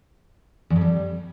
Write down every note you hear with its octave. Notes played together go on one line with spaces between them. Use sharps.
E2
F2
G3